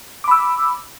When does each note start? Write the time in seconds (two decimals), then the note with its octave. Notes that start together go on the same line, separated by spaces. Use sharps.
0.24 D6
0.28 B5
0.31 E6